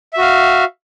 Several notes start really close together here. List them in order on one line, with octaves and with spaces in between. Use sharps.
E5 F#4 F5